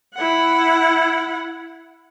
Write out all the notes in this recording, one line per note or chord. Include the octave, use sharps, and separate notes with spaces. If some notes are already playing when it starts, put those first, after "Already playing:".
E4 F#5